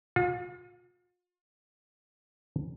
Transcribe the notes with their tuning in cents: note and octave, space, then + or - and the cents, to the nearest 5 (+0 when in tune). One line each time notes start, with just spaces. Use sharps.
F4 +40